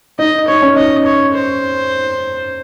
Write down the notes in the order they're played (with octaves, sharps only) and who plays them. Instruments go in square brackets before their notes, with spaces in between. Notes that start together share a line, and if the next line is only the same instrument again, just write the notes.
[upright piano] D#4 [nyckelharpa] D#5
[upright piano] D#4 [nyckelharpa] C#5
[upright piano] C#4
[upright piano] D#4 [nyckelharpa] D#5
[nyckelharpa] C#5
C5